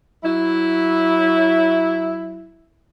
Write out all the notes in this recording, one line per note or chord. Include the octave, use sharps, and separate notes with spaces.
F#3 E4